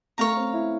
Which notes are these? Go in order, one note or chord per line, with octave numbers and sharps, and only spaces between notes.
A3 C#5 F5 A#5
C4
E4